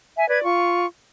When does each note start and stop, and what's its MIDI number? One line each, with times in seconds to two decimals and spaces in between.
0.17 0.27 76
0.17 0.27 80
0.29 0.42 71
0.29 0.42 74
0.29 0.42 92
0.44 0.86 65
0.44 0.86 85